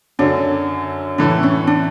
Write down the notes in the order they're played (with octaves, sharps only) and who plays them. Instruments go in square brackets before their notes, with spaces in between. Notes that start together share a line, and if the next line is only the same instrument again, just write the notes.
[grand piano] F#2 D3 F#3 [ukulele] D4
[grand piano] A2 E3 A3 E4 A4 [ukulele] D4
[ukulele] C#4
D4